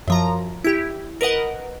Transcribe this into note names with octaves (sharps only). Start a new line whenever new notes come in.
F#2 F3 A#5
E4 G4
A#4 B4 D#5 F#5